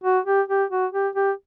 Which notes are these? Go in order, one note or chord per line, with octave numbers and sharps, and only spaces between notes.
F#4
G4
G4
F#4
G4
G4